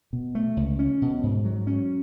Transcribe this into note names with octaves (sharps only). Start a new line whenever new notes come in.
B2
A3
C#2
C#4
B2
G#2
F#3
C#4